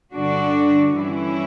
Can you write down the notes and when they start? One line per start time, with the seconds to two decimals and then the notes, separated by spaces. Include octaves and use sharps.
0.13 G2 D3 D4 F#4
0.95 G2 E3 C#4 E4